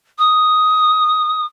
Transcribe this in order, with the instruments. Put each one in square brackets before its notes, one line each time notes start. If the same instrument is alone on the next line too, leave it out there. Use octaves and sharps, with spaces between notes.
[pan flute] D#6